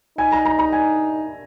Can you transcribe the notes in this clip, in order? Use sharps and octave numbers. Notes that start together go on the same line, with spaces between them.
D#4 G#5
A#5
A#5
A#5
G#5